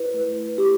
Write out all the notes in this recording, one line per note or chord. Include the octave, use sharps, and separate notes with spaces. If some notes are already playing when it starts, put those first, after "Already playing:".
Already playing: E4 B4
A3
E4
G4